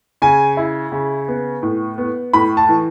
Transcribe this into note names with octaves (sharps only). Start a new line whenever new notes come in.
C#3 G#5
E4
C#3
B3
A2
B3
A2 B5
A5
E3